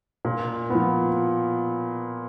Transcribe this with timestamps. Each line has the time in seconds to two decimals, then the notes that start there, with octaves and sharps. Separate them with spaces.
0.25 A#2
0.70 F3 B3